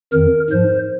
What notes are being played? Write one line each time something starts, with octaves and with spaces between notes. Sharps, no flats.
F2 D#3 A#4
G#2 F3 C5